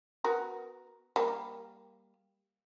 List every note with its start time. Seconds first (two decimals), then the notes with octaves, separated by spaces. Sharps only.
0.24 B3 F#4 A#4
1.16 G3 A#3